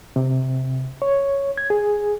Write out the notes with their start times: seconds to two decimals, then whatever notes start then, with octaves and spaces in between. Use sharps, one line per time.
0.16 C3
1.02 C#5
1.58 G#6
1.70 G#4